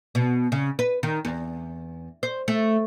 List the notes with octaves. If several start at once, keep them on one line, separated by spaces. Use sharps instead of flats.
B2
C#3
B4
D#3
E2
C5
A3